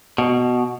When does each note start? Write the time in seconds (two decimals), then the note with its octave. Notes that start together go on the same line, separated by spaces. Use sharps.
0.18 B2